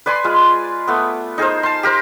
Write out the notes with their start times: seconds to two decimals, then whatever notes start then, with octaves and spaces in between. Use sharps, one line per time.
0.06 B4 D5 G#5 C6
0.24 G#3 F4
0.88 A3 B3
1.38 D#4 G#4 A#4 C5
1.63 A5 C6
1.83 G4 A#4 C5